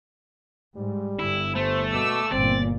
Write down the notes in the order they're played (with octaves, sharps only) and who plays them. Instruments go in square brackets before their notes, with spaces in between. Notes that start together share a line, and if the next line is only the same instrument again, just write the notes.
[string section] G#2 [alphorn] G3
[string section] G1 [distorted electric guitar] E4
[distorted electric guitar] A3 [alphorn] C5
[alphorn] B2 [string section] D6 E6
[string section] G1 A#2 [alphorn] C4 [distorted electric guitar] D5